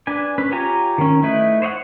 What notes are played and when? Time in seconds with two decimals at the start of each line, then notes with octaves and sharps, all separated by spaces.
0.07 D4 B4 G#5
0.38 C#4 B4
0.52 F4 G4 C#5 G#5 A#5
0.98 D#3 C#4
1.23 A3 D#4 E4 B4
1.62 C5 C#5 D#5 F#5